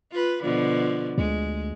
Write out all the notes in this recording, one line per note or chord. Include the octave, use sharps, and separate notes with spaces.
F4 B4
B2 D3 F3
D2 G#3